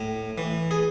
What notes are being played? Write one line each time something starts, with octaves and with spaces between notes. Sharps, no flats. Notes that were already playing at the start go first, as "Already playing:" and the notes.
Already playing: A2
E3
G#4